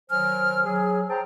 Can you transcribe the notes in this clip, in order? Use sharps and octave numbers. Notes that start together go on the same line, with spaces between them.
D#3 F#3 C5 G#5 F6
F#3 G#4
C5 G5 A5 A#5